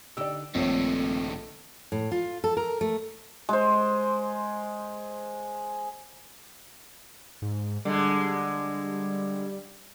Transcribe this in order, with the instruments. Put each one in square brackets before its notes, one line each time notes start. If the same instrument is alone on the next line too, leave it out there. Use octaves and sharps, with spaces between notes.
[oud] D3 D#4 G4 [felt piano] D5 E6
[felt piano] A#1 C#5 [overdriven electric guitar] G2 D#3 [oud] A3 [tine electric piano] C4
[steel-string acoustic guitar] A2
F4
A4
A#4
A3
[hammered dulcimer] G#3 C5
[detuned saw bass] G#2
[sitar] D3 G#3 [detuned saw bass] G3